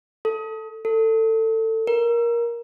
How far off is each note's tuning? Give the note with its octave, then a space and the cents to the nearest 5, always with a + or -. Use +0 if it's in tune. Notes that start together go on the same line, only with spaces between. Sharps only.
A4 +5
A4 +25
A#4 +15